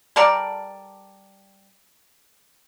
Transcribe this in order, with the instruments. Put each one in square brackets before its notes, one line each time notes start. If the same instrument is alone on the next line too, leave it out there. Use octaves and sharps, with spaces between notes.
[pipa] G3 A4 A#4 D5